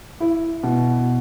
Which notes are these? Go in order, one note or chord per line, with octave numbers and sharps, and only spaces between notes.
E4
B2